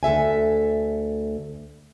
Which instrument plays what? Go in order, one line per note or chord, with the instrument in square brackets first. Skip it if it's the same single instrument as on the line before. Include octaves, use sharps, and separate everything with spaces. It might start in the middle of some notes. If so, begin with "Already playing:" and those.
[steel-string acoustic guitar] D2 A4 E5 G#5